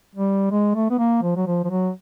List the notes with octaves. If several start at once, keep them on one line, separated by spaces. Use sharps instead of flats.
G3
G#3
A3
B3
A#3
F3
F#3
F3
F3
F#3